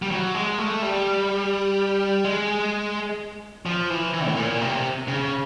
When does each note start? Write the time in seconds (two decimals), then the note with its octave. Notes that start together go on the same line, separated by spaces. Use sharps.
0.02 G3
0.11 F#3
0.35 G#3
0.58 A3
0.82 G3
2.24 G#3
3.66 F3
3.90 E3
4.14 E3
4.26 A2
4.37 A#2
4.61 C3
5.08 C#3